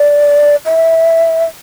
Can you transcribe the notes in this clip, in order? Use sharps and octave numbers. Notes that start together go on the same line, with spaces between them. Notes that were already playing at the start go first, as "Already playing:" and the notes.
Already playing: D5
E5